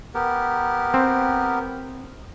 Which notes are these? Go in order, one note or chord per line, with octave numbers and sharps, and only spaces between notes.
B3 G4 A#4
C4